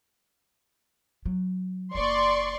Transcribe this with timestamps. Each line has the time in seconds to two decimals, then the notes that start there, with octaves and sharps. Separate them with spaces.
1.25 F#3
1.95 F#1 A#3 D5 C6 C#6